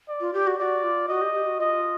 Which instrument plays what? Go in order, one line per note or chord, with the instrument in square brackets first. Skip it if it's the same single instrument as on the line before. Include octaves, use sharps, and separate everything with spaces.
[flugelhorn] D5
[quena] F4
G4
F#4
[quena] F#4 [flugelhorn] D5
[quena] F4
[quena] F#4 [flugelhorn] D#5
[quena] G4
G4
F#4
[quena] F4 [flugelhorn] D#5